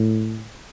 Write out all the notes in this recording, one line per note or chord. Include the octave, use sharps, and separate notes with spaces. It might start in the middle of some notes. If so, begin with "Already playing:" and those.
Already playing: A2